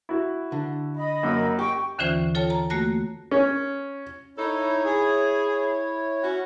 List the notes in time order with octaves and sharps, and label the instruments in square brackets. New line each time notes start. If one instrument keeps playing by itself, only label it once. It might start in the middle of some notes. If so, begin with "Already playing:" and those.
[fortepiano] E4 F#4
[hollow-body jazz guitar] D3
[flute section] D#5 B5
[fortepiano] F#2 A#3
[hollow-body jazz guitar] G4 [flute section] G5 C#6
[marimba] D#2 D3 E3 C#4 F4 C5
F4 A4 C#5 G5 A5
A5 A#5
A3 A#3 F#4 A5 F#6 A#6
[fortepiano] C#4
[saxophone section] D#4 A4 [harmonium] E4 C#5
[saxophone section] G#4
C#4 F#4